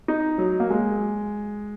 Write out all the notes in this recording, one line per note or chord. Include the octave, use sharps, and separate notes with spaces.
D#4
F#3
A#3
G#3